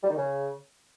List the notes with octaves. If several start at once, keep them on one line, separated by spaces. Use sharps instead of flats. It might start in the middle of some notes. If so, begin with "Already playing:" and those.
G3
D#3
C#3